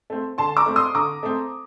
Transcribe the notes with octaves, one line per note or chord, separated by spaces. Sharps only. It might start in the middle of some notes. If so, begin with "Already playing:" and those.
A3 C4
D3 A5 C6
A#5 D6
A3 C4
C6 D#6
D3 A#5 D6
A3 C4